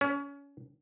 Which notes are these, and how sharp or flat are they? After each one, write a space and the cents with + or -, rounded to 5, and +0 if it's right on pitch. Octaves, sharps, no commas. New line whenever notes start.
C#4 +25